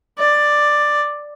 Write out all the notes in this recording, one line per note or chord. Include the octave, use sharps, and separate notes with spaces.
D5